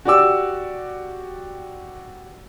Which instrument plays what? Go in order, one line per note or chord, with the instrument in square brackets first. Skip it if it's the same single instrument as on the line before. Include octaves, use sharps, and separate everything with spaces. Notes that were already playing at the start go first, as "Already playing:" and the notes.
[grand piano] F#4 G4 D5 G5 D6 E6